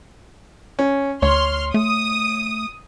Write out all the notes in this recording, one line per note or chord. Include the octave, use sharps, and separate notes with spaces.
C#4
D2 C#5 C6 F6
A3 D#6